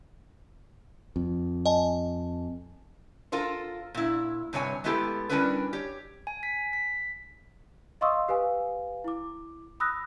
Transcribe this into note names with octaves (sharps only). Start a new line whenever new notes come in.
F2
D#5 G#5 A5
F4 A4 A#4 C5
A#2 E4
G2 C3 C#5 G#5
G#3 A3 B3 E4 G4 A4
G3 C#4 D4 E4 A#4 B4
G4 C#5
G#5
B6
B6
D#5 F5 C6 C#6 D#6 E6
G4 B4 F5 G#5
E4 D6
B5 D#6 E6 F#6 A#6